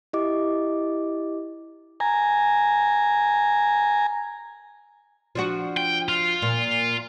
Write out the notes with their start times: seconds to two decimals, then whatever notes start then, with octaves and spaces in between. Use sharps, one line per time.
0.13 E4 G4 D#5 D6
2.00 G#5 A#5
5.35 F3 D4 F#4
5.77 G5
6.09 F4
6.42 A#2